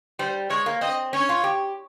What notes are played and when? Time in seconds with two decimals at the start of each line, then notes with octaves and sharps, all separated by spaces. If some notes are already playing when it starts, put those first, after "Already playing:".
0.19 G3 C5
0.50 G#3 C#5
0.66 A#3
0.81 C4 D#5
1.13 C#4 C#5
1.29 F4
1.44 G4